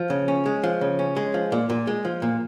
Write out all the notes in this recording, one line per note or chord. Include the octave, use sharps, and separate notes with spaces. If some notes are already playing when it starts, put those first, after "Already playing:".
Already playing: F3
C#3
C#4
G#3
F3
C#3
C#4
G#3
F3
A#2
A#2
G#3
F3
A#2